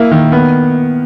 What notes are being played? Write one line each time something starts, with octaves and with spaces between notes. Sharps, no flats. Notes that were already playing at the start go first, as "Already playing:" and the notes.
Already playing: A#3 E4
D#3
B3